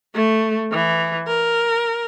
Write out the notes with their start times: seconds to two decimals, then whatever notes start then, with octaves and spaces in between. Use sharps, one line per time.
0.15 A3
0.72 E3
1.27 A#4